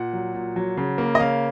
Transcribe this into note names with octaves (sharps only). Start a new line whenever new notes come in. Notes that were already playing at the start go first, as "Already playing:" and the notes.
Already playing: A#2 F#5
F#3
A#2
F#3
C#3
A#3
D#5
C#3 F5